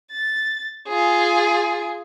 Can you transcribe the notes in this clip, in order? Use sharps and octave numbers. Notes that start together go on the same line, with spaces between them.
A6
F4 G#4